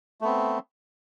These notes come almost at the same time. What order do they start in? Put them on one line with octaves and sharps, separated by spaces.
A3 B3 C4